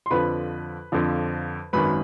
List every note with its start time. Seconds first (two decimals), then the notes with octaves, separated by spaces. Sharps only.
0.06 C6
0.11 F2 D3 F3 B4 B5
0.92 F2 D3 F3
1.73 G#1 F#2 D#3 B4 B5